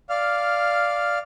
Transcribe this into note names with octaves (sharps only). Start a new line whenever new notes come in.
D5 F5 F6